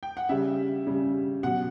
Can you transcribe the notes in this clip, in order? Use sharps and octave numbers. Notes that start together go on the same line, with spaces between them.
G5
F#5
C#3 G3 E5
C#3 G3
B2 F#3 F#5